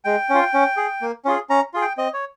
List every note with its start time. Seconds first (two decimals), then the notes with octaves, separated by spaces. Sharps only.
0.05 G#3 G5
0.29 C#4 F4
0.54 C#4
0.77 G#4
1.02 A#3
1.25 C#4 F4 G#4
1.50 C#4 A#5
1.74 F4 G#4
1.82 G5
1.98 C4 D#5
2.14 C#5